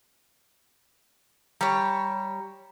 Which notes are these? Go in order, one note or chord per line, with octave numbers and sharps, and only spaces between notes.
G3 G4 C#5 A#5